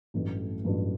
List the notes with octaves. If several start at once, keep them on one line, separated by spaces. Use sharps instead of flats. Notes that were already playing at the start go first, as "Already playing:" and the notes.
A1 G2 F#3 A3
A1 G2 F#3 A3